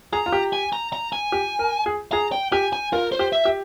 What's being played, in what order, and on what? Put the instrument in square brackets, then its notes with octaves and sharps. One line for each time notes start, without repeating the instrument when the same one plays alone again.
[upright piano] G#4 [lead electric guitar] A#5
[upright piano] F4
G4
[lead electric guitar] G#5
A#5
A#5
G#5
[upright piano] G4
A#4
G#4
[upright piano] G#4 [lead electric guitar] A#5
[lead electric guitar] G5
[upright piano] G4 [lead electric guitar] G#5
[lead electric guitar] G#5
[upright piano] F4 [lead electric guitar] A#4
[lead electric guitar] C5
[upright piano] G4
[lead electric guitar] E5
[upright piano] G4